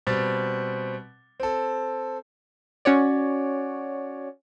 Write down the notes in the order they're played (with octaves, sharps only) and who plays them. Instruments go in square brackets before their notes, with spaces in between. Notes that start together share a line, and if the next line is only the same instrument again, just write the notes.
[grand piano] B2 G3 C4 A6
C4 A4
[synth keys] C#4 F#4 C#5 D5